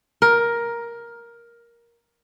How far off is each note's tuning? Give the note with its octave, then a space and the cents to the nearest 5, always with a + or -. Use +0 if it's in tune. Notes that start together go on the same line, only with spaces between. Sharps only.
A#4 +10